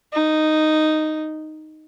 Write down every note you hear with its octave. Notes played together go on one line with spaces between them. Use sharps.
D#4